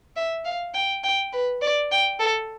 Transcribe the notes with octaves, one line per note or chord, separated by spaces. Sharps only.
E5
F5
G5
G5
B4
D5
G5
A4